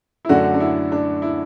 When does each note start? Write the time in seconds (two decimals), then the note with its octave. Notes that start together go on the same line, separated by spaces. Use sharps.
0.25 E4
0.29 F#2 D3 A3 D4 F#4
0.54 D4
0.60 E4
0.92 D4
1.22 E4